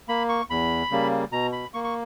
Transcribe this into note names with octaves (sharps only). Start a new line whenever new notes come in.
A#3 B5
C#6
E2 B5
C#3 G3 A#3
B2 A#5
B5
A#3 C#6
C#6